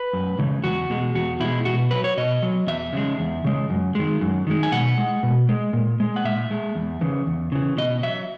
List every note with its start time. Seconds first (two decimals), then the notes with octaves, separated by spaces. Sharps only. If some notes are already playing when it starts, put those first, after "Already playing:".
Already playing: B4
0.13 F#2
0.39 C#3 E3 G#3
0.63 E2 F#4
0.90 B2 G#3
1.15 E2 F#4
1.40 B2 G#3 E4
1.65 B2 F#4
1.91 F#3 B4
2.04 C#5
2.17 B2 D#5
2.42 F#3
2.67 E2 E5
2.93 C#3 G#3
3.19 E2
3.45 C#3 G#3
3.70 F#2
3.95 D#3 G#3
4.21 F#2
4.47 D#3 G#3
4.63 G#5
4.72 B2 F#5
4.98 G#3
5.23 B2
5.49 G#3
5.73 A#2
6.00 G#3
6.16 F#5
6.24 A#2 E5
6.51 G#3
6.75 E2
7.01 C#3 E3
7.27 E2
7.52 C#3 E3
7.77 B2 D#5
8.03 F#3 E5